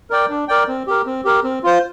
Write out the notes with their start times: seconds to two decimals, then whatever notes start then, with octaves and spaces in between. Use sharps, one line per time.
0.10 A#4 D5 G5
0.29 D4
0.48 A#4 D5 G5
0.68 C4
0.87 G4 A#4
1.06 C4
1.25 G4 A#4
1.44 C4
1.63 F4 C5